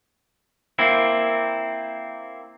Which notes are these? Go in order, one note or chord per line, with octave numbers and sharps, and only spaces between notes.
A#3 C4 E4